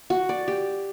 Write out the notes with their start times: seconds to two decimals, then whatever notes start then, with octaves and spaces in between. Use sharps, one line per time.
0.10 F#4
0.29 D5
0.48 G4